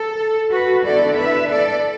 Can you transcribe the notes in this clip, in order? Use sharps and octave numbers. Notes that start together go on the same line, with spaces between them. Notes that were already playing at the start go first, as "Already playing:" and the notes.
Already playing: A4
F#4 B4
D3 B3 E4 A4 D5
B4 E5
A4 D5